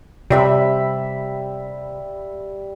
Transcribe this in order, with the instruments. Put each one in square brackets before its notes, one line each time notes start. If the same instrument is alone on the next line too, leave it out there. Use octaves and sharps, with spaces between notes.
[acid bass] C3 [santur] G3 E5 B5